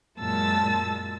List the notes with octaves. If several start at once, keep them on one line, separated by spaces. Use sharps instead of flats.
F#2 A#2 G#3 A5 E6 A6